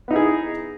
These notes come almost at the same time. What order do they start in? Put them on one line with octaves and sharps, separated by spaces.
B3 D#4 E4 G#4